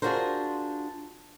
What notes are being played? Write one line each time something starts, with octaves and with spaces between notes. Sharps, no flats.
D4 F4 F#4 G#4 A#4 C5